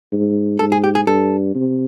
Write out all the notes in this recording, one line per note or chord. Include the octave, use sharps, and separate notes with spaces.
G#2
G#2 A4
G#4
G4
G#4
G2 A4
C3